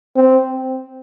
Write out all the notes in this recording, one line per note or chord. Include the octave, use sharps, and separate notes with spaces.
C4